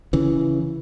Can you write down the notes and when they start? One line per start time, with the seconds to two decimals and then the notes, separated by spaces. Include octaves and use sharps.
0.13 C#3 E3